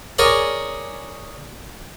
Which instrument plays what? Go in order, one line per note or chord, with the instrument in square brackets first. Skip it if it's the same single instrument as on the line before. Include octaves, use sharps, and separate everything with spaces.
[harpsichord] G#4 A#4 C#5 D5